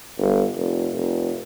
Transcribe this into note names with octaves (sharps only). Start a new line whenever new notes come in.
G1
F1
F1